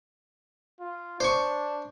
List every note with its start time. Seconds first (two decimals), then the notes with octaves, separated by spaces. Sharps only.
0.80 F4
1.20 D4 C5 C#6